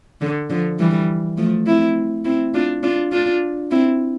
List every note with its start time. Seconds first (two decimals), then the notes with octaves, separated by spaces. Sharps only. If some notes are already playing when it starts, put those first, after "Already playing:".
0.21 D3
0.50 D3 F3
0.79 E3 G3
1.37 F3 A3
1.67 C4 E4
2.25 C4 E4
2.54 D4 F4
2.83 D4 F4
3.12 D4 F4
3.71 C4 E4